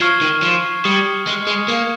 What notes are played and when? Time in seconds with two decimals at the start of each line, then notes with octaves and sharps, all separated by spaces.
0.01 F3 C#6 F6 G#6 C7 G7
0.21 D#3
0.42 F3
0.85 G3 D#6 G#6 C#7 G7
1.27 G#3
1.47 G#3
1.68 A#3 G#6 C7 F7